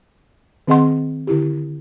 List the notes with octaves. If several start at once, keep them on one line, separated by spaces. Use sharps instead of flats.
D#3 C4 G#4 D#5 F#5 C6
D3 E4 G4